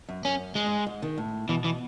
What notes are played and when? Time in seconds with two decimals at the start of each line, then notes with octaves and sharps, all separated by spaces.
0.09 F#2
0.25 F#2 C#4
0.55 G#2 G#3
0.66 G#2
0.87 G#2
1.02 D#3
1.18 A2
1.49 B2 E3
1.64 E3